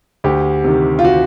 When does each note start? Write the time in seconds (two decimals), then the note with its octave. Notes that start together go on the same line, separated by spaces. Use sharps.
0.24 D2 G4
0.64 C3 D#3
0.99 F4
1.05 F#4